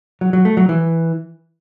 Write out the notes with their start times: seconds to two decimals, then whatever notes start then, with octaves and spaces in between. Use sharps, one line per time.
0.21 F#3
0.33 F#3
0.45 A3
0.57 F#3
0.69 E3